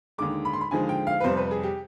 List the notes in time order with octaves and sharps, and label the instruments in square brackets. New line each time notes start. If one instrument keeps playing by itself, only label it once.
[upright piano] D#2 D3 G#3 D6
B5
C6
B5
D#2 D3 F3 G#3 G#5
G5
F5
B4
F2 C3 G3 C5
B4
G#4
G4